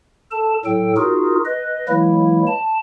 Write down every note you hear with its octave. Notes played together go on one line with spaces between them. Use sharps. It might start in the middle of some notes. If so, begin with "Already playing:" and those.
A4 A5
A2 F#3 A4 G5
D#4 F4 F#4 G#4 A#4
B4 D#5
E3 F#3 G#3 A#3 E4
A5